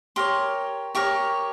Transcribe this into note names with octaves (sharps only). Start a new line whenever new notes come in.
G4 A#4 C#5 C6
G4 A#4 C#5 C#6